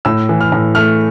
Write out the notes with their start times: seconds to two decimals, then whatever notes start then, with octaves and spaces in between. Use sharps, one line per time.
0.05 A2 E6
0.29 E3
0.41 F6
0.52 A2
0.75 A3 F6